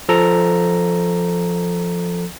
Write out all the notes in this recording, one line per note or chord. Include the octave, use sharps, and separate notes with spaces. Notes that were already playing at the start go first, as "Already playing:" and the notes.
F3 A4 A#5